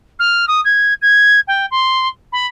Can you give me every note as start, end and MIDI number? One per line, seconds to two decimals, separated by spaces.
0.19 0.46 89
0.48 0.61 87
0.65 0.94 92
1.02 1.40 92
1.48 1.66 79
1.71 2.08 84
2.33 2.47 83